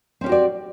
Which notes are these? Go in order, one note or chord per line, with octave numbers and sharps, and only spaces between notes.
C4 C#4 F#4 G4 D5